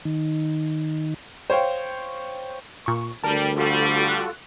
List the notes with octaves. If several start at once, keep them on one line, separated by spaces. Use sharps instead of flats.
D#3
C5 C#5 F5 G5
A#2 C#6
D2 G3 A#4 A5
G3 F4 F#4 A4
F#6